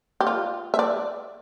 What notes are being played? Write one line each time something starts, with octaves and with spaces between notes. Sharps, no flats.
G4
F4
E5
D5